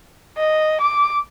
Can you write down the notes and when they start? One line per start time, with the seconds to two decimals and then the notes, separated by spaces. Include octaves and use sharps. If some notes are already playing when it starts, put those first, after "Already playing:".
0.37 D#5
0.82 D6